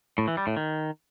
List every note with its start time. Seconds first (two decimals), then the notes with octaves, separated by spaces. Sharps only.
0.18 A2
0.28 E3
0.37 G3
0.47 A2
0.57 D#3